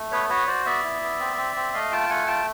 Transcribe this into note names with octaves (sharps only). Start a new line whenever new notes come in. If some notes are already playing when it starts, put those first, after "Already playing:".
Already playing: A3
B3 B4 C#5
F#4 B4 C#5
F#4 C5 D5
B3 D5 E5
E4
B3
C4
C4
C4
A3 D#5 F5
F4 G5 A5
A3 F#5 G#5
F4 G5 A5